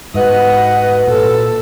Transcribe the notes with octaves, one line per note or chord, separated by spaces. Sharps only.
G#2 F#4 B4 D#5 F#5
A#2 A4